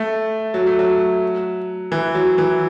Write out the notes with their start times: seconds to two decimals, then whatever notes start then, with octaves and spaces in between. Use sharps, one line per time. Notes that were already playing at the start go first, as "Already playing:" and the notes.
Already playing: A3
0.54 F#3
0.67 A3
0.79 F#3
1.92 E3
2.15 F#3
2.38 E3